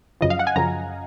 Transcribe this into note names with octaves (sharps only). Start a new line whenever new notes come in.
F#2 C#3 F3 D#5
F5
F#5
G#5
F#2 C#3 F3 A#5